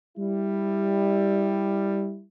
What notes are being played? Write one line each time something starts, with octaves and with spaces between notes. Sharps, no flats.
G3 E4